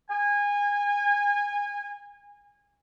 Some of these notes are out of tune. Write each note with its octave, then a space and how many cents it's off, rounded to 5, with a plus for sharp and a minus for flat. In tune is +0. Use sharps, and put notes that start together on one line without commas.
G#5 -25